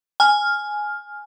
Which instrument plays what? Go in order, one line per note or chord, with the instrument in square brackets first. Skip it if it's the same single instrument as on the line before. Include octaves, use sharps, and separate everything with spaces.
[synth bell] G#5 F6